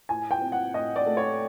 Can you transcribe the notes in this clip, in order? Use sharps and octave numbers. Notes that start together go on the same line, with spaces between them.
A2 G#5
G5
C4
F#5
A2 D#5
D5
A3
C#5